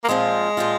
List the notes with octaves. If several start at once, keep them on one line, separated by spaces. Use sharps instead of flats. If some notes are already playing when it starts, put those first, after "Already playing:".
A#3
A#2 F3 G#3 C4 F4
A#2 F3 C4 F4